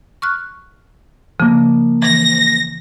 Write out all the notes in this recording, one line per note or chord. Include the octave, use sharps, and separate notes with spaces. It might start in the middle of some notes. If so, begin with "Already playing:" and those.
C#6 F6 F#6
C#3 F3 A#3
E3 A#6